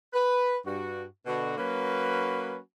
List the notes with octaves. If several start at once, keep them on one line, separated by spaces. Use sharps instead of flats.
B4
G2 F#4
B2 D3 F#4
F#3 A#3 C#4 F#4 B4